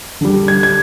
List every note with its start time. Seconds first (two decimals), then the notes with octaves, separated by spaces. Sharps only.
0.21 D3 G3
0.48 G#6
0.63 G#6